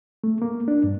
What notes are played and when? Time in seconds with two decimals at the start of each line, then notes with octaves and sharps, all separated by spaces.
0.24 A3
0.42 A#3
0.68 D4
0.84 G2